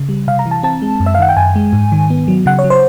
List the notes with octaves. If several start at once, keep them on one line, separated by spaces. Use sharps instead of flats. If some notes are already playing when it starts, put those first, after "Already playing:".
Already playing: C#3
G3
C3 F5
A#5
E3
A5
C4 A5
G#3
F#2
E5
F5
D#3 F#5
G5
F#2 G#5
G#3
G#2
D#3
B3
F#3
C#3 F#5
C#5
F#3
C5